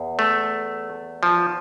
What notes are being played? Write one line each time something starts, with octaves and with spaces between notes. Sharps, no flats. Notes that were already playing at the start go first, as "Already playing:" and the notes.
Already playing: E2
A3
F3